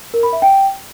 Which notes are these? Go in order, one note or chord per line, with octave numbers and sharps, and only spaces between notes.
A#4
B5
E5
G5